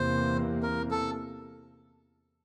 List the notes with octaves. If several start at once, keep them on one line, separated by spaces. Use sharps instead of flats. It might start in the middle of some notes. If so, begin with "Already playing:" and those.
Already playing: E2 C3 E3 A#3 C5
A#4
A4